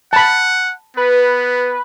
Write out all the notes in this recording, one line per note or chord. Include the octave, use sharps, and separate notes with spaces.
F#5 A5 B5
B3 B4